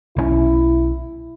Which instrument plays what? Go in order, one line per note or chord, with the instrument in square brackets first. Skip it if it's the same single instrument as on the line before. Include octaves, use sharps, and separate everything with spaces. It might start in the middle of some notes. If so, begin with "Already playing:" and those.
[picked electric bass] B1 D#3 C#4 [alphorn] E4